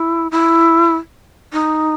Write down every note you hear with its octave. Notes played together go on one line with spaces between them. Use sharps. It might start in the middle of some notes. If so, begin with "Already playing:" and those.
Already playing: E4
E4
D#4